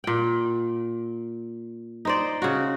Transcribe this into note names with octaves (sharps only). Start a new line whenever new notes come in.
A#2 G5
D#4 C5 D5
C#3 F#4